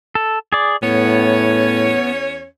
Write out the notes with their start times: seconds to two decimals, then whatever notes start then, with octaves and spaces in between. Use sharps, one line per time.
0.15 A4
0.52 G#4 D5
0.83 E2 A2 B3 C#4 C#5